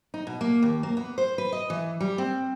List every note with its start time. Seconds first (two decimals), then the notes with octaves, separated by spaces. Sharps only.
0.14 D#4
0.27 B2
0.41 A#3
0.63 D#2
0.83 A#3
0.97 B3
1.18 C5
1.38 B4
1.52 D#5
1.70 E3
2.01 G3
2.18 C4